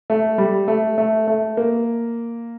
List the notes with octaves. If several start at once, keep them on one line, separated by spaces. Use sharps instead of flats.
A3
G3
A3
A3
A3
A#3